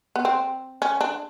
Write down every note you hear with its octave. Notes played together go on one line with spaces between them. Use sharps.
B3
C4
C#4
D4